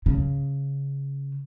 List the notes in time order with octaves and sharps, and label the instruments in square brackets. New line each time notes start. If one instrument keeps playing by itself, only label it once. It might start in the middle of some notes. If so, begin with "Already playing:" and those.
[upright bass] C#3